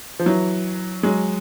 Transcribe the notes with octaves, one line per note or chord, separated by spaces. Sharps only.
F3
E3 F#3
F#3 G#3